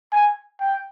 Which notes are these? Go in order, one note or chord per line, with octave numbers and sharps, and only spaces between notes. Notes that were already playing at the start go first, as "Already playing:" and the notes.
G#5
G5